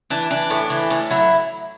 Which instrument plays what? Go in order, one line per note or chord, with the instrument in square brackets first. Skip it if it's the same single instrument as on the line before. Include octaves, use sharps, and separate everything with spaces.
[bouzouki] E3 D4
E3 D4
A2
E3
A2
F#3 E4